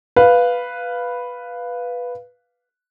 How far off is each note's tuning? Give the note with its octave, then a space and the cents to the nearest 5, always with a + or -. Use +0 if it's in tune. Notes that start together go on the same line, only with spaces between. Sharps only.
B4 +0 F5 +0